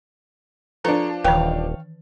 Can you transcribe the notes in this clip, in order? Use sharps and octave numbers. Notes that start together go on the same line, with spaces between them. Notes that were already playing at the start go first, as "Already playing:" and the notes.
F3 D4 A4 B4 C#5 A#5
D#1 D#3 E3 B4 C#5 F5 G5